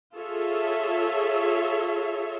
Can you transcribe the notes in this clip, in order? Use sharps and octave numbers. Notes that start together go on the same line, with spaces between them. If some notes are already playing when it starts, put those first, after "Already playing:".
F4 G#4 A4 C#5 E5